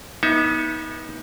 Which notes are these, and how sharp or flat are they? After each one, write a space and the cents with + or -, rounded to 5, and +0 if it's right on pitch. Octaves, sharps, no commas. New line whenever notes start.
B3 -30 D#4 +25 E5 +0